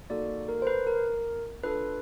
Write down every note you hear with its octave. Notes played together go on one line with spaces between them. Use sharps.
A#3 D#4 F#4 A4 D5
A#4
C5
B4
A#4
D4 F4 A4 B4